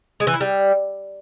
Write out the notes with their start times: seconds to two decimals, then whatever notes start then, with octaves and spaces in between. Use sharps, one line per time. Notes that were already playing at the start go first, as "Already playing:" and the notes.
0.20 G#3
0.27 E3
0.34 E4
0.41 G3